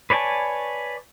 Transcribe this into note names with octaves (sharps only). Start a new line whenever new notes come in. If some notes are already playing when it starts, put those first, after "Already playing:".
B4 C#5 D5 G#5 A5